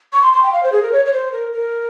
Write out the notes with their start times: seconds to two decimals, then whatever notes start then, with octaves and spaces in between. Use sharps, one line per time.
0.13 C#6
0.23 C6
0.33 C6
0.43 G5
0.53 F5
0.63 C5
0.72 G#4
0.83 A#4
0.92 C#5
1.06 C#5
1.13 C5
1.32 A#4
1.52 A#4